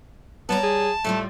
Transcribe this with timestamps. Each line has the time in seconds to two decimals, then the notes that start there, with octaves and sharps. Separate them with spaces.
0.49 G3 B3 C#5 A5 A#5
0.63 G#4
1.04 A2 G3 A3 F4